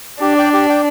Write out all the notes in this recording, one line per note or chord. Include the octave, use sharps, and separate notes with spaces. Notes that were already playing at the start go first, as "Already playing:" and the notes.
D4 G4
D5 G5
G4
D5 G5